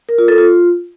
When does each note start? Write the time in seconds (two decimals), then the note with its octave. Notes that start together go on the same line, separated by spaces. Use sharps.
0.09 A#4
0.18 F4
0.28 A4
0.38 F4